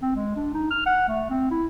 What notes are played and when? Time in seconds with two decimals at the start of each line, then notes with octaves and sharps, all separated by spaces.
0.02 C4
0.15 G#3
0.36 D4
0.54 D#4
0.71 F6
0.86 F#5
1.08 A3
1.30 C4
1.51 E4